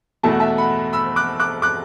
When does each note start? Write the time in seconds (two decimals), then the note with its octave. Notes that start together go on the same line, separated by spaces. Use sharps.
0.23 E2 B2 A3 E4 A5
0.32 F#5
0.40 E5 A5
0.58 F#5 B5
0.93 B5 E6
1.16 D6 F#6
1.40 D6 F#6
1.62 D6 F#6